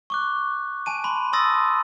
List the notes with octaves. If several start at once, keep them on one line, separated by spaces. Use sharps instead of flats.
C#6 D6 F#6
G#5 A5 D#7
B5 C6
A5 C6 D#6 E6 A6 A#6